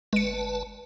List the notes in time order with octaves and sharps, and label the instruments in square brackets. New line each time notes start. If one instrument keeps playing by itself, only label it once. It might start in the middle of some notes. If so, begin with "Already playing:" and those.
[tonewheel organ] G1 B4 A5 [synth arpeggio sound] G#3 C#7